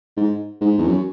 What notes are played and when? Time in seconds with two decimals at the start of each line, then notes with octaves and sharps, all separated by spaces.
0.17 G#2
0.61 G#2
0.78 E2
0.87 F#2